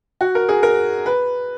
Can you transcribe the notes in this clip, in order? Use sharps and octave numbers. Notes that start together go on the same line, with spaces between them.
F#4
A#4
G#4
A#4
B4